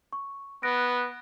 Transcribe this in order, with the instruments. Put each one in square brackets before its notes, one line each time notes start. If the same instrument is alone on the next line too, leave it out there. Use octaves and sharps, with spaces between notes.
[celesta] C#6
[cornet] B3 [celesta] F#6 A#6 D7